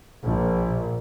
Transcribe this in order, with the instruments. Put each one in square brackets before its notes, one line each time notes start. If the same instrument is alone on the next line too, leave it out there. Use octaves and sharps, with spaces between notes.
[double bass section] A#1